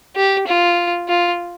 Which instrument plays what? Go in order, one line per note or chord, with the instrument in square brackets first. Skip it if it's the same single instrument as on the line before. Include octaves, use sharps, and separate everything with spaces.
[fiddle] G4
F4
F4